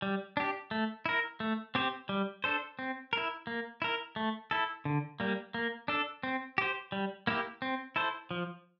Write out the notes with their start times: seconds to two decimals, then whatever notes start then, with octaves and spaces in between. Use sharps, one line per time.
0.02 G3
0.37 D4 G4
0.71 A3
1.06 E4 A#4
1.40 A3
1.75 C4 G4 C5
2.09 G3
2.44 D4 A4 C5
2.79 C4
3.13 E4 A#4
3.47 A#3
3.82 E4 A#4
4.16 A3
4.51 E4 A4
4.85 D3
5.20 G3 A#3
5.54 A#3
5.88 D4 A4
6.23 C4
6.58 G4 C5
6.92 G3
7.27 A#3 E4 G4
7.62 C4
7.96 E4 A4 C5
8.31 F3